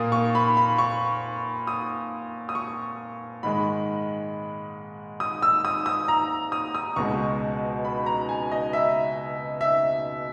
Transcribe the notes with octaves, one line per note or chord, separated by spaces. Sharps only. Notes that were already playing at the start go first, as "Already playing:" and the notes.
Already playing: A#2 A#3 D#6
C#6
B5
B5
C#6
D#6
D#6
C#6
G#2 D#3 G#3 B5
D#6
E6
D#6
D#6
A#5
D#6
D#6
C#2 B2 G#3 C#6
B5
A#5
G#5
D#5
E5
E5